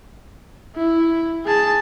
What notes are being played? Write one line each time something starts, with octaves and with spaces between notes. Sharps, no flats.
E4
G#4 A5